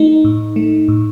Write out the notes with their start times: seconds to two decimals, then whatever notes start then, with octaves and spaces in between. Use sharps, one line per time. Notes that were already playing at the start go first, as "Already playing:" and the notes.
Already playing: A3 D#4
0.24 A2
0.56 A3
0.88 A2